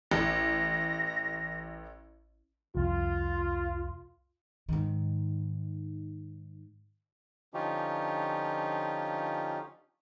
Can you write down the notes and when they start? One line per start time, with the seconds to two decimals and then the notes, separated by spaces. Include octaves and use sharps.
0.11 A1 A#6
2.75 C2 F2 F4
4.69 G#2 D#3
7.54 D3 F3 C#4 D#4 F4 G4